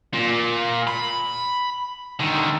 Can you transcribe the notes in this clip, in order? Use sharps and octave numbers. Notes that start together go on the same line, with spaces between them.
A#2
B5
D3 D#3